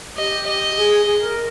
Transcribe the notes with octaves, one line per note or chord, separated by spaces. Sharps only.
G4 D#5
D#5
G#4
G#4
A#4